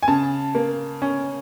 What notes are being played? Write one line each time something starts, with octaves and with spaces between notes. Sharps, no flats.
G#5
C#3 A5
A#3
C#4